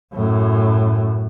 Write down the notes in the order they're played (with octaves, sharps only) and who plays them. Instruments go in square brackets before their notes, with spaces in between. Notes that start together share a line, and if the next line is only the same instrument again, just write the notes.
[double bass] F#2 A2